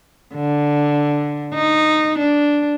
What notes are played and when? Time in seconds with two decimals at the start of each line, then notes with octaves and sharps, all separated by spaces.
0.36 D3
1.55 D#4
2.18 D4